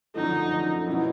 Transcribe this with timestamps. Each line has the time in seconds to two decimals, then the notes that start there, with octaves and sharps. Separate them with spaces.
0.14 F#2 D3 F3 A3 D#4
0.51 F#2 D3 F3 A3
0.87 B2 F#3 A#3 C#4 E4